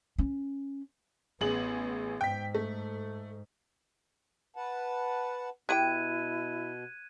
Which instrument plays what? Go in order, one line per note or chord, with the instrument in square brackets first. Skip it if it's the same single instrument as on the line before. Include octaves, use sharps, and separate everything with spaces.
[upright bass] C#4
[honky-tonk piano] A1 G#4 F#7 [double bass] B3
[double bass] G#2 [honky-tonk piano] G5 B6
[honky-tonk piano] A3
[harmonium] B4 F#5 A5
[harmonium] B2 [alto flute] E4 [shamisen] G4 F#5 G5 [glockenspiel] F#6 G#6 D#7